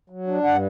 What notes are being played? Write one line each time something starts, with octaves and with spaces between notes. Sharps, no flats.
F#3
D4
G2 F#5